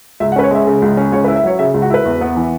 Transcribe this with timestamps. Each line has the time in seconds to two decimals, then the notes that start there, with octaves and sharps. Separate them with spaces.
0.20 C#2 E5
0.32 F#5
0.36 C#4 B4
0.44 C#5
0.51 G#3 E5
0.67 C#3
0.82 C#2
0.97 C#4
1.12 C#2 C#5
1.24 B4
1.28 E4
1.36 E5
1.44 F#3 C#5
1.59 C#3 E5
1.74 C#2
1.82 F#4
1.90 E4 B4
2.05 E2
2.21 B3
2.37 E3